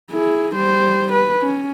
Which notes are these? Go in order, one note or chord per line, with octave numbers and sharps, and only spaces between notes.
E4 G#4
G3 C5
B4
C#4